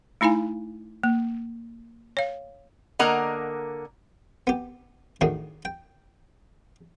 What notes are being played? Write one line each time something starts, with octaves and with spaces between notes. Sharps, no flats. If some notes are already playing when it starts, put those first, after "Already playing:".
A3 D#4 E4 F5 G#5
A#3
C#5 F5
D3 A#3 A#4 D#5 F#5 A#5
B3 G4
A2 D#3 D4 F#4 G#4
G5